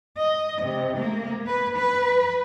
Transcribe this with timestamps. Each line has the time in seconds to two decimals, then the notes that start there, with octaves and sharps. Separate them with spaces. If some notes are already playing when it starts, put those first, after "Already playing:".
0.18 D#5
0.62 C3
0.98 A#3
1.47 B4
1.77 B4